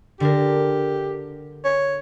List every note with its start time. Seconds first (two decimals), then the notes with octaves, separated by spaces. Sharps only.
0.20 D3 D4 G4 A#4
1.65 C#5